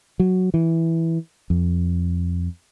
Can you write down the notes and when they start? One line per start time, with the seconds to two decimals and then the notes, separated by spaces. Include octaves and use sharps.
0.20 F#3
0.54 E3
1.50 F2